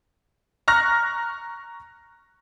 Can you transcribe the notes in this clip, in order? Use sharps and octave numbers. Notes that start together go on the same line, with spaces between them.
A#5 C#6 F6 F#6 A#6